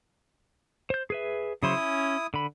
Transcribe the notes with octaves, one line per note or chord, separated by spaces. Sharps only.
C5 G6
G#4 B4 E5
C#3 F#3 E4 C5 D#6
C#4
D3 B5